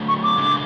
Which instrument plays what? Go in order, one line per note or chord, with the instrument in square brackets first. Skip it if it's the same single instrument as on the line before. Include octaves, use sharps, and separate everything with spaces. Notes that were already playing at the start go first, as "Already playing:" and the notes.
Already playing: [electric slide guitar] D3 F#3 A3
[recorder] C#6
D6
[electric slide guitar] C#3 G#3 D4